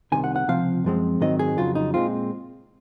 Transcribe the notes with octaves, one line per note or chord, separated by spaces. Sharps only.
C2 C3 D#3 G#5
F#5
F#5
C#2 C3 F3 C4 F5
F#2 F3 G#3 C4
G#2 D#3 F#3 C4 D#5
G#4
F2 C#3 F#3 F4
D#4
A#2 G#3 C4 F4